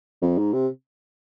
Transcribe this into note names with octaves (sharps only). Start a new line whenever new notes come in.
F2
G#2
C3